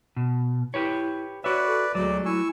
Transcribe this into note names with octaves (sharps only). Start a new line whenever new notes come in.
B2
E4 G4 B4 C#5
F#4 B4 C#5 D5 E5
A4
D2 F#3 G#3 A3 D5
E4 G#5 C#6 E6